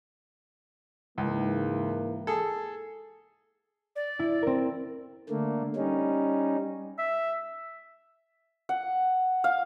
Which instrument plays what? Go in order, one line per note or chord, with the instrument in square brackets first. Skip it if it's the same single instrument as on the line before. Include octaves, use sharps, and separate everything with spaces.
[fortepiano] C#2 [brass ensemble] G#2 E3 A#3
[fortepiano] G#4 A4
[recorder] D5
[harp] E4
C4 A#4
[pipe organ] D3 A3 A#3
G3 C#4 D#4
[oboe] E5
[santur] F#5
F5